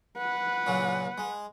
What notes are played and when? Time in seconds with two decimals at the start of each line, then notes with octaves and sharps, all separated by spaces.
0.17 B4 F#5
0.67 A#2 C#3 F#3
1.18 G#3